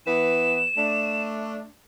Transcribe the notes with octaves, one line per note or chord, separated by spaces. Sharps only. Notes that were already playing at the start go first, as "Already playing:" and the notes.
E3 B3 B4 E7
A3 D4